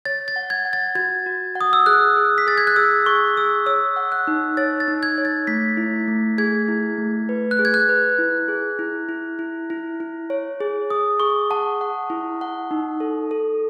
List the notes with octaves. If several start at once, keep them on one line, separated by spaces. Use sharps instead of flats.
C#5 A6
A6
F#5
G#6
F#5
A6
F#4 G#6
F#4
F#5
D#6
E6
G#4 F#6
G#4
B6
G#4 A6
G#6
F#6
G#4 E6
G#4 C#6
G#4 E6
C#5 E6
F#5
F#6
D#4
C#5 A6
A6
D#4
G#6
C#5
A6
A3 B6
E4
A3
G#4 G#6
E4
A3
B4
F#6
G#4
G#6
F#6
B4
E4
G#4
E4
E4
E4
E4
E4
C#5
G#4
G#4 D#6
G#4 C#6
F#5 A5
F#5
E4
F#5
D#4
A4
A4